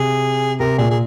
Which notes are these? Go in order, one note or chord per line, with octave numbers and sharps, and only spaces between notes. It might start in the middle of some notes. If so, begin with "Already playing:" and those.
Already playing: C3 G#4
C3 A#4
A#2 G#4
G#4